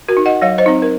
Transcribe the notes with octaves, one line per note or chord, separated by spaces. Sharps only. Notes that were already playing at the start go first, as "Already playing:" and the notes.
F#4 A#4
D#4
D#5 F#5
F#3 C#5 F5
C5 D#5
C4 D#4
A#4